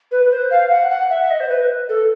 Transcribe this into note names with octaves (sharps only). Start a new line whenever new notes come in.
B4
C5
F5
F#5
F#5
E5
E5
D#5
C5
B4
A4